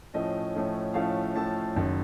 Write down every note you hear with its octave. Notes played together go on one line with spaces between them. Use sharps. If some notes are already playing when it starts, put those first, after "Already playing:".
A2 F3 A3 C#4 D#5
A2 F3 A3 C#4
A2 F3 A3 C#4 F5
A2 F3 A3 C#4 A5
F#1 F#2 D#3